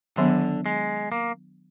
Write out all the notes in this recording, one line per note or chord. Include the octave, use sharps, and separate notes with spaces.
D3 D#3 F#3 B3 D4
G#3
A#3